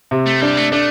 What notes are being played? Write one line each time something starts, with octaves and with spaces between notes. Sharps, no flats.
C3
A3
G3 D4
A3
A3 D4